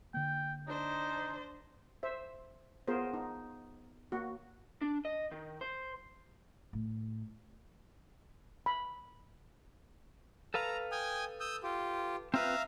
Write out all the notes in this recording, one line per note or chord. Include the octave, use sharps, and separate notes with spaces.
D3 A#3 G5
D4 D#4 C5
C5 E5
B3 F4 G#4 A#4 C5
D#4
A#3 F#4
D4
D#5
D#3
C5
A2
B5
A4 B4 F5 A#5
G5 G#5 D#6
D#6 E6 G6
F4 G4
C4 F4 B4 E5 F5 A#5